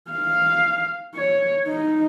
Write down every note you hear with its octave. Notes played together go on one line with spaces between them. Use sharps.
F5
C#5
D#4